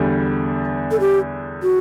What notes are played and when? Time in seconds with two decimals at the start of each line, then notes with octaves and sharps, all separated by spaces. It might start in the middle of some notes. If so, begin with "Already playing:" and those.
Already playing: E2 D3 G3
0.91 A4
1.00 G4
1.63 F#4